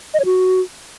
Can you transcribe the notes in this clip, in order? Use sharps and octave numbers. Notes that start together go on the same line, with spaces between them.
D#5
C#5
F#4